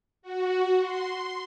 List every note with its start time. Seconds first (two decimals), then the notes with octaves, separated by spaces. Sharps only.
0.22 F#4
0.79 C6